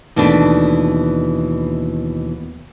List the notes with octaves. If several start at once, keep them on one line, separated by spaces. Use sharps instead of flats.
D#2 B2 E3 A3 D4